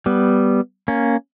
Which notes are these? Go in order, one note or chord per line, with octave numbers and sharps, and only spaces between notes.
G3 B3
A#3 C#4